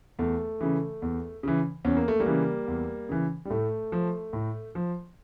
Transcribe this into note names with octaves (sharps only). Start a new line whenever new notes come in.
E2 A3
C#3 E3
E2
C#3 E3
E2 C#4
A#3
A3
G3 A#3
C#3 E3
E2
C#3 E3
G3
A2 A3
F3
A2
F3